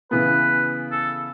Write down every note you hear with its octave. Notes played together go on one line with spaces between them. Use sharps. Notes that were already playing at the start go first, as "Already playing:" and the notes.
C#3 E3 B3 B4
A4